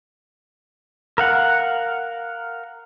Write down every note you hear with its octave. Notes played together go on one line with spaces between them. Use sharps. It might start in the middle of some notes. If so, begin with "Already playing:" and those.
A#4 F5 F#5